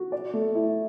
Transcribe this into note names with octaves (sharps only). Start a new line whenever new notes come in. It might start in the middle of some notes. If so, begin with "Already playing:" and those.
Already playing: F#4
D5
A3
E4